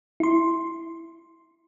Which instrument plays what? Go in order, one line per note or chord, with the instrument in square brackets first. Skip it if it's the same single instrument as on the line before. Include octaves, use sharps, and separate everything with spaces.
[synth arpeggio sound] E4 C6